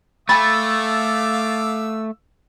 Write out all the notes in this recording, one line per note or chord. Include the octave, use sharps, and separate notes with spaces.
A3 F5 G#5 B5 D6 E6 A6